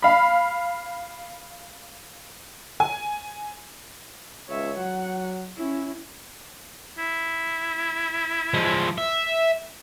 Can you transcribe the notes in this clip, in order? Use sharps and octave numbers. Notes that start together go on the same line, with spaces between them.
F5 B5
G#5
C#2 C#5 E5
F#3 F#5
C#4 E4
E4
F3 G#3
E5